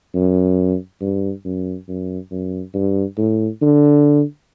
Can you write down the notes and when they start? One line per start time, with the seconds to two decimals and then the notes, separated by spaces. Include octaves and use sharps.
0.15 F#2
1.01 G2
1.45 F#2
1.88 F#2
2.32 F#2
2.74 G2
3.18 A2
3.62 D3